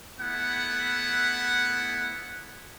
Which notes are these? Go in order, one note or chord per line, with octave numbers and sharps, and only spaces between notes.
A3 B3 E4 F#5